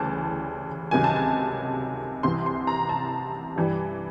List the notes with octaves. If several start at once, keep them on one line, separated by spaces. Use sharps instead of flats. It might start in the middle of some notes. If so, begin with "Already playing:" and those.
Already playing: D2 C#3 E3 G3 A5
C#2 C3 D#3 F#3 G#5
A5
G#5
C2 C3 E3 C6
C6
A#5
A5
G2 E3 G3